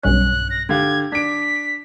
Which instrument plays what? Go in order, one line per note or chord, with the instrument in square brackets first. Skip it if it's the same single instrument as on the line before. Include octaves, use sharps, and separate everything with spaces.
[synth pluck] B1 G2 C#4 [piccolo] F#6
[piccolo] A#6
[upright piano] D3 G4 F5 [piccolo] G#6
[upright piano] D4 D7 [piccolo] B6